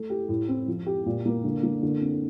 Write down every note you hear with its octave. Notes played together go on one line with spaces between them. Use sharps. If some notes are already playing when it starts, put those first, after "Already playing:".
Already playing: A3
G4
A2
C4
F3
G4
A#2
A#3
D3
A#3
D3
C4